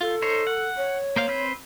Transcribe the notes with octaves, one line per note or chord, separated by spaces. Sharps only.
F4 A4
D#4 C5 C#5
F#5
C#5
A#3 C5 F5
C4 B4 C5